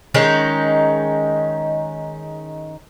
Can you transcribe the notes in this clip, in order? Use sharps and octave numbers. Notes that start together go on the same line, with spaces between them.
D#3 G#3 C#4 D#4